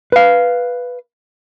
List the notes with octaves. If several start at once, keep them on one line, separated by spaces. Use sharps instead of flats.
B4 F5